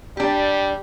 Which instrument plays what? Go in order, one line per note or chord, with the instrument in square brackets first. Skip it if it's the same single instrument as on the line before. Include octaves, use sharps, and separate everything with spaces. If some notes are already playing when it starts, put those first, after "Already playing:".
[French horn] G3 [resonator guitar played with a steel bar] D4 G4